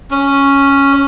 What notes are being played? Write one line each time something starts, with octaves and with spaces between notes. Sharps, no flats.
C#4